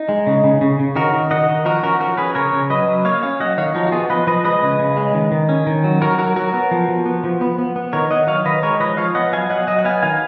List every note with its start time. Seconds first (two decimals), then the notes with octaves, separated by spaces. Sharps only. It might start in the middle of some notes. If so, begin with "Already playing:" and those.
Already playing: D#4
0.09 G#3
0.27 C#3
0.44 C#3
0.61 C#3
0.79 C#3
0.96 D#3 F#4 A#4
1.13 D#3
1.31 D#3 D#5 F#5
1.48 D#3
1.65 F3 F#4 A#4
1.83 C#4 F#4 A#4
2.00 F3 F#4 A#4
2.17 C#4 G#4 B4
2.35 C#3 A#4 C#5
2.53 C#3
2.70 F#3 B4 D#5
2.88 F#3
3.05 A#3 C#5 F5
3.22 C#4 C#5 F5
3.40 F#3 D#5 F#5
3.57 D#3 C#5 F5
3.75 F3 D#4 F#4
3.87 F#4
3.92 B3 F4 G#4
4.10 F3 B4 D#5
4.27 F3 B4 D#5
4.45 G#3 B4 D#5
4.63 C#3
4.79 C#3
4.97 G#3
5.14 D#3
5.32 D#3
5.49 C#4
5.67 D#3
5.84 F#3
6.02 F#3 F#4 A#4
6.18 F#3 F#4 A#4
6.36 F#3 F#4 A#4
6.54 B3
6.71 F3
6.88 F3
7.06 B3
7.24 F3
7.41 B3
7.58 B3
7.76 B3
7.93 D#3 A#4 C#5
8.11 D#3 D#5 F#5
8.27 F#3 C#5 F5
8.45 D#3 B4 D#5
8.63 G#3 A#4 C#5
8.80 F3 B4 D#5
8.97 F3 C#5 F5
9.15 B3 D#5 F#5
9.32 F#3 F5 G#5
9.50 F#3 D#5 F#5
9.67 F#3 D#5 F#5
9.79 F#5
9.84 B3 F5 G#5
10.02 D#3 F5 G#5